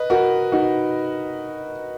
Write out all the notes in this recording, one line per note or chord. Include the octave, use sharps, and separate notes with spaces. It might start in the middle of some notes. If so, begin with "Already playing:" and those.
Already playing: B4 D#5
F#4 A#4
D#4 F#4